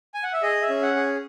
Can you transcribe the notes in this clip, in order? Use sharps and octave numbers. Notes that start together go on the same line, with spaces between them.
G#5
F#5
E5
G#4 D#5
E5
C#4
F#5
G#4